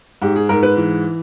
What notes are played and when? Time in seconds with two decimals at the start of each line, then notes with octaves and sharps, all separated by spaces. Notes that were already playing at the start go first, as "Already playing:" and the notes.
0.22 G#2 G4
0.36 G#4
0.49 G#2 A#4
0.63 B4
0.77 E3